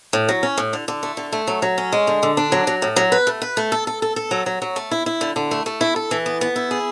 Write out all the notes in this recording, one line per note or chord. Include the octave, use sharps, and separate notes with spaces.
A2
F#3
C#4
A2
D3
D3
A3
D3
A3
F#3
F#3
C#4
G#3
D3
D3
D4
F#3
F#3
A2
F#3
B4
A3
B4
A3
A4
A4
A4
A4
F#3
F#3
F#3
A3
E4
E4
D3
D3
A3
A3
E4
A4
E3
B3
B3
E4
G#4